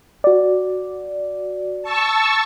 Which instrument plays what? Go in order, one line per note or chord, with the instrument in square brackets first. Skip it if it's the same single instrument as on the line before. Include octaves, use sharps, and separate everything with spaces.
[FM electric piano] F#4 D5
[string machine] A5 C#6 E6